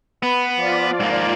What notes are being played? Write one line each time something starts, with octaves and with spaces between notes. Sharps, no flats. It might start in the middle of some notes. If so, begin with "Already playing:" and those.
B3 B4
F3 F4 D5
G#2 A#3